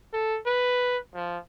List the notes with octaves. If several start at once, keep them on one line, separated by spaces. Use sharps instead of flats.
A4
B4
F3